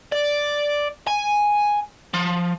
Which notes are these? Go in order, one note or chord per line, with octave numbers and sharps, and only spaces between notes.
D5
G#5
F3